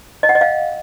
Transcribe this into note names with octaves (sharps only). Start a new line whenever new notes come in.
D#5
F#5
D#5
F5